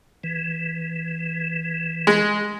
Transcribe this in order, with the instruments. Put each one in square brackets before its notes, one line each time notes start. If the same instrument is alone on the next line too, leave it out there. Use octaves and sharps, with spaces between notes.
[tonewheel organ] E3
[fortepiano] G#3